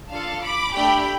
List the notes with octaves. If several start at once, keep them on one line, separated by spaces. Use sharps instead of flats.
D4 F4 A4 F5 A5
B5 D6
A3 D4 G4 G5 B5